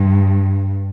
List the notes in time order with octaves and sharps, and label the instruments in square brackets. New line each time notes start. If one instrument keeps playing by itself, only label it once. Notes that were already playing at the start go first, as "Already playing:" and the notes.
Already playing: [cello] G2